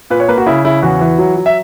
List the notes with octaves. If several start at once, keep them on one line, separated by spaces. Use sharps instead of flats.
A#2 B4
C#5
A#3 B4
F#4
C#3 E4
C#3 E4
E2 F#4
E3
F#3
F#3
E5